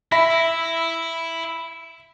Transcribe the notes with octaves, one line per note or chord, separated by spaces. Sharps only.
E4 E5 B5 A#6